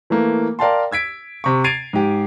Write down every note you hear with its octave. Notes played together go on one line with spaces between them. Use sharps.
E3 A3 A#3
A#4 D5 F5 G5 A5 C6
E6 G#6 B6 D7
C3 C#6
G#6 A6 C7 D7 D#7 F7
G#2 G4